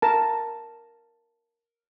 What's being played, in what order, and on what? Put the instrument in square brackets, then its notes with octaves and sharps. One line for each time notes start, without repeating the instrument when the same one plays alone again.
[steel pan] A#4 A5